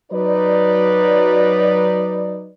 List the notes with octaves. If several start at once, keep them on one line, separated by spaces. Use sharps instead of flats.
F#3 D#4 B4 D5